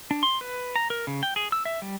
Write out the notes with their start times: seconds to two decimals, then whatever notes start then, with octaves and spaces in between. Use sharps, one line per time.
0.11 D4
0.23 C6
0.41 B4
0.76 A#5
0.90 A#4
1.07 C#3
1.23 G5
1.36 G#4
1.52 E6
1.65 E5
1.82 G3